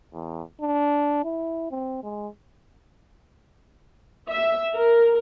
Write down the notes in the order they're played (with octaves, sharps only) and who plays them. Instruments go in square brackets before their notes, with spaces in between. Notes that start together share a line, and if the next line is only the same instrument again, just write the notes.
[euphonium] E2
D4
E4
C4
G#3
[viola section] E5
A#4